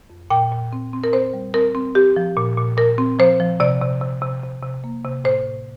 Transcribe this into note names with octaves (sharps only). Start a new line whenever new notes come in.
F2
A#2 G5
A#2
C4
C4
A#4
C4 C5
G3
C4 A#4
C4
C4 G4
F3
A#2
A#2
A#2 A#4
C4
F3 C5
F3
C3 D5
C3
C3
C3
C3
C3
A#3
C3
A2 C5
A2